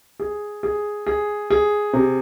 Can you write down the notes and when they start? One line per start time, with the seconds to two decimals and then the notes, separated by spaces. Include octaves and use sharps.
0.20 G#4
0.63 G#4
1.07 G#4
1.50 G#4
1.93 C3